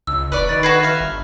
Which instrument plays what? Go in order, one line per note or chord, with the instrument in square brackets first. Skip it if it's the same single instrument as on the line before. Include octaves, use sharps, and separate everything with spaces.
[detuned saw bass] C#2 [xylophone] E6
[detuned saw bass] E1 [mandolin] B4 C#5 D5
[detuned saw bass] D#3 [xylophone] A6
[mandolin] F#4 A4 B4 [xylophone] B5 G#6 C7
[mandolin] E5 F5
[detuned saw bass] G1